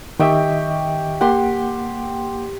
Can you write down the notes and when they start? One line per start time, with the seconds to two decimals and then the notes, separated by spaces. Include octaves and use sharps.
0.20 D#3 G4 D#5 E5 G5 C#6
1.21 A#3 G4 F#5 C6